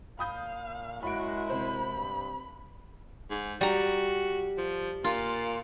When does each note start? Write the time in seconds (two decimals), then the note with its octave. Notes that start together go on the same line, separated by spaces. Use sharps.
0.19 A#2 F5 B5 D#6 G6
1.03 F#2 G#3 E4 F#4 B5 D7
1.50 C3 C5 B5
1.96 G2
3.30 G#2
3.61 G3 F#4 A#5
4.58 F3
5.04 A#2 F4